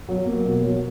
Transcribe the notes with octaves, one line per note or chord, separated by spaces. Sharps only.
F#3
A#3
B2
F#3